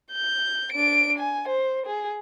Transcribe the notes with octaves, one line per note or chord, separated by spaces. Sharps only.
G6
D4 D7
G#5
C5
G#4